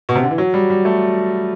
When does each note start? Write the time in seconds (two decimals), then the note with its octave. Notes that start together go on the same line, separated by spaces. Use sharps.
0.09 B2
0.15 C3
0.23 D3
0.31 E3
0.38 F#3
0.54 G3
0.70 G3
0.85 A3